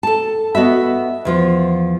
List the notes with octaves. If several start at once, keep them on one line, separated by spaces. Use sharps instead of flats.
A4 A5
B3 F#4 D#5 E5
E2 F3 F4